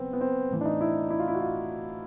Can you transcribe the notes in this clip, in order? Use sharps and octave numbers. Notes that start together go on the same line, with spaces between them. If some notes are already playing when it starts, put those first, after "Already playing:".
Already playing: C#3 F#3 B3 C4
B3
C4
A2 E3
D4
D#4
E4
E4
F4
E4
F#4
F4